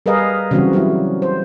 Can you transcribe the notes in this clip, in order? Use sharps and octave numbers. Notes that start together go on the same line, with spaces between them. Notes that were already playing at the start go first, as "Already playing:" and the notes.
G3 G#4 A#4 B4 D#5 F5
C#3 E3 F#3 G3 C4 F#4
F#3 G3 C#4 E4
C5